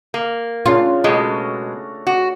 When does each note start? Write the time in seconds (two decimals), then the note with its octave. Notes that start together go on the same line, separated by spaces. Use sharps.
0.14 A#3
0.66 C#3 C#4 D4 F4
1.04 B2 G#3 A3 F#4
2.07 F#4